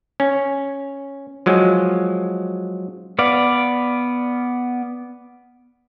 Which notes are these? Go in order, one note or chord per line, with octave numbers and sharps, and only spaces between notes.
C#4
F3 F#3 G#3
B3 D5 F5